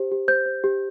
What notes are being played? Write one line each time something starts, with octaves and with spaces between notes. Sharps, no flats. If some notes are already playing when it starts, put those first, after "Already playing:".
Already playing: G4 C5
G4
C5 G6
C5
G4